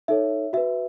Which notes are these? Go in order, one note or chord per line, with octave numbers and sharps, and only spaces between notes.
D#4 A4 C#5 E5
F#4 B4 E5